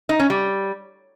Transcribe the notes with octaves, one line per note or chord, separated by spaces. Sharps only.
D#4
C#4
G3